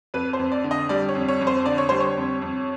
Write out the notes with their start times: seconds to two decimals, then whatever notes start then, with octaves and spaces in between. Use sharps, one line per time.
0.14 F2 B4
0.33 C5
0.39 F2
0.52 D5
0.64 D3
0.71 D#5
0.89 G3 D5
1.09 C#5
1.15 F2
1.28 C#5
1.41 F2
1.47 C5
1.66 D3 D5
1.78 C#5
1.89 G3 C5
2.00 C#5
2.17 F2
2.42 F2